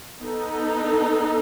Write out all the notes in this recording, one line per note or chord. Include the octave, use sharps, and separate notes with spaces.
B3 D#4 A4